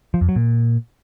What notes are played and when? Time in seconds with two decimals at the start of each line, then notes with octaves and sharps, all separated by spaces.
0.14 F3
0.21 F2
0.29 F#3
0.36 A#2